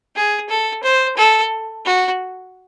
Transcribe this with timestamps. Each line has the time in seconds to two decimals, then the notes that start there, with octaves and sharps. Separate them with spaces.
0.15 G#4
0.49 A4
0.83 C5
1.17 A4
1.85 F#4